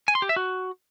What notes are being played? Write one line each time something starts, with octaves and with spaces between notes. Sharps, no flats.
G#5
C6
G4
E5
F#4